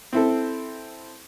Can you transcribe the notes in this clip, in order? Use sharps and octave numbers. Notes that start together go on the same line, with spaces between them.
C4 E4 A4